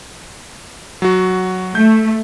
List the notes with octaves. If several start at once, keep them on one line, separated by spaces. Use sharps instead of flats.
F#3 F#4
A3 G6